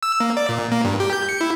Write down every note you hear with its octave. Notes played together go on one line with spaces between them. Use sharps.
E6
A#3
D5
A#2
A#3
G2
G4
G6
C#7
E4